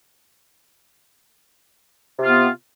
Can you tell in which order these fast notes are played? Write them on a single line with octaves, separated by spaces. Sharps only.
C3 F4 B3